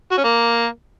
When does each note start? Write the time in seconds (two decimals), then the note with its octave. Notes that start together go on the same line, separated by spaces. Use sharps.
0.12 F#4
0.18 C#4
0.24 A#3